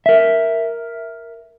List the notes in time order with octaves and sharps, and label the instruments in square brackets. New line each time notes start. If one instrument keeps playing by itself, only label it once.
[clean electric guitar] A#4 E5